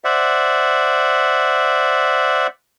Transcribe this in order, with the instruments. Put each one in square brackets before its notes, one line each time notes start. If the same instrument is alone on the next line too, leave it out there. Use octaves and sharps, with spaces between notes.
[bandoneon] C5 D5 E5 F#5